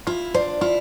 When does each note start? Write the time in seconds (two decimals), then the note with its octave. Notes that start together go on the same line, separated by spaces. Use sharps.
0.07 E4 F4
0.34 D4 C5
0.61 E4 F4